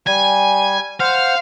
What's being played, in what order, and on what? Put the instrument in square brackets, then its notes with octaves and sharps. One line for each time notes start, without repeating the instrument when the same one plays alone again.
[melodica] G3 [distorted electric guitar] G#5
[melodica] C5 F#5 [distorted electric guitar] F5